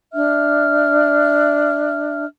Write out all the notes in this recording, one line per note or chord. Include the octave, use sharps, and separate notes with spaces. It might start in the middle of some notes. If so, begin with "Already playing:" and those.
D4 E5 F6